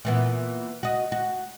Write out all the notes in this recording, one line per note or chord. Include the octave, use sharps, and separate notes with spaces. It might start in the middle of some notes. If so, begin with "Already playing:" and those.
A#2 E3 B3
F#4 D#5
F#4